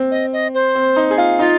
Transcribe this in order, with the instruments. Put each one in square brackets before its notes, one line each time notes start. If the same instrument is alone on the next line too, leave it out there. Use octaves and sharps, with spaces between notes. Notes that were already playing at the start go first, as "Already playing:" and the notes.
Already playing: [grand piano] C4
[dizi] D#5
D#5
C5
[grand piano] C4
D#4
G#4
F4
[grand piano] D#4 [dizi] F4